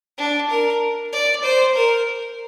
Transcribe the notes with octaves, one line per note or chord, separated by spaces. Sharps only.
D4
A#4
D5
C5
A#4